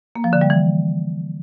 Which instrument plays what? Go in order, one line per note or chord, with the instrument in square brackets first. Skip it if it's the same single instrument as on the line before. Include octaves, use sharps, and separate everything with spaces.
[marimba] A#3
F3
D3
G3
E3